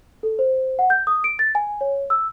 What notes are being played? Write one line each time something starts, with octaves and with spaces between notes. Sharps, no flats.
A4
C5
F#5
G6
D#6
D7
A6
G#5
C#5
E6